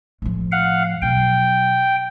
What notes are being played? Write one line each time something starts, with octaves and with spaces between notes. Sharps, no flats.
A2 F3
F5 F#5
B2 F#3 G5